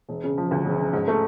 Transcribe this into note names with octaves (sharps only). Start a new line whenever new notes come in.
E1
C#3
F3
D2
E1
C#3
G#2
A3